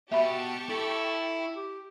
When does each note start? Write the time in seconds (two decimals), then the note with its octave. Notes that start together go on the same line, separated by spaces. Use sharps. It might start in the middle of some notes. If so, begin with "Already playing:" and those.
0.12 B2 G4 E5 A5 B5 C#6
0.69 E4 A4
1.56 G4